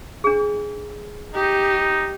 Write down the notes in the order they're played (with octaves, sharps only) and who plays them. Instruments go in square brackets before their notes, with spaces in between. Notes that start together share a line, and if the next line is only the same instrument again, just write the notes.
[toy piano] D4 G#4
[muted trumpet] D#4 [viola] G4